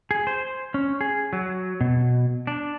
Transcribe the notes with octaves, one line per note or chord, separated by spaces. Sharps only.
G#4
C5
C#4
G#4
F#3
B2
D4